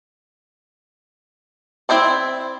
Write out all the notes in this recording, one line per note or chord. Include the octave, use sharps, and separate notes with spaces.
C4 E4 C5 D5